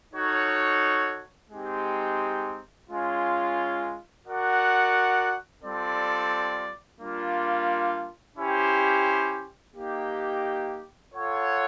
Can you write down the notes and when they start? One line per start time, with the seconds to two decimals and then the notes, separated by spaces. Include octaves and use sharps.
0.14 D#4 F#4 A4 C#5
1.50 G#3 C4 D#4 G4
2.88 G#3 C#4 F4
4.25 F#4 A#4 D5 F#5
5.63 G3 C4 F4 A4 D5
7.00 G3 A#3 D4 F4
8.37 C#4 E4 G4 C5
9.74 A#3 D#4 G4
11.11 F4 A4 C#5 F#5